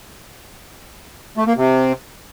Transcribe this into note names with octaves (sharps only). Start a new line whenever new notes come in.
A3
A#3
C3